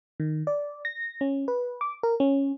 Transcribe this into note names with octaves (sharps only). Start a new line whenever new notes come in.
D#3
D5
A#6
C#4
B4
D6
A#4
C#4